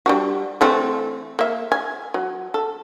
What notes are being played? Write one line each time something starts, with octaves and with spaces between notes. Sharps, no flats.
G3 D4 F#4
E3 A3 C4
A#3 E5
G#5
F#3
A4